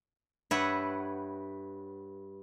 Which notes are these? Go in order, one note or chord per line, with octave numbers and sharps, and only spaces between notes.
G2 B4 C#5 E5 F#5